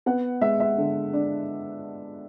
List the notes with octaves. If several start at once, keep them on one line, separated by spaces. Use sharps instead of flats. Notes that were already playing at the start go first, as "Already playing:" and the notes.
B3 F#5
G#3 E5
E5
D3
D4